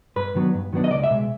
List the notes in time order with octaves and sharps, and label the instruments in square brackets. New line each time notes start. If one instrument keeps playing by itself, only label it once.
[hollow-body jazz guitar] G2 B4
D#3 F#3 B3 D4
G2
D#3 F#3 B3 D4
D#5
C#2 D5
E5
B2 G#3